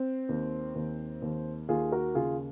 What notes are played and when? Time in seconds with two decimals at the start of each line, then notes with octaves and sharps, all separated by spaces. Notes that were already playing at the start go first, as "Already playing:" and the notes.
Already playing: C4
0.29 D#2
0.75 D#2
1.22 D#2
1.69 D#2 F4 G#4
1.92 F#4 A#4
2.15 C#3 F4 G#4